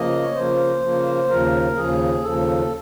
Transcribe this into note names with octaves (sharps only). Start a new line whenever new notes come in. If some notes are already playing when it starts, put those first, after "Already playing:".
Already playing: C#3 F3 A#3 D#5
C#5
C#3 F3 A#3 C5
C#3 F3 A#3
D#2 C#3 F3 A#4
D#2 C#3 F3 G#4
D#2 C#3 F3 A4